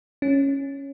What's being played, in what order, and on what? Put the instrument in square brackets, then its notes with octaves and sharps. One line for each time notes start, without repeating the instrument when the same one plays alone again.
[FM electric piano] C#4